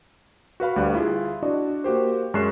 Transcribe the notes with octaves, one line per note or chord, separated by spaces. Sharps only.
F#4 B4 F5 B5
D2 G3 F#6
E4 F4 G#4
D4 E4 F#4 D5 D#5
A#3 F#4 G4 C5
F#2 G#3 C#6 F#6 C7 E7